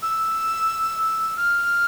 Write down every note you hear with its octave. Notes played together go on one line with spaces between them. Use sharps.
E6
F6